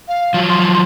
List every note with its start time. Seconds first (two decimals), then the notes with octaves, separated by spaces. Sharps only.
0.08 F5
0.34 F3 F#3
0.49 C6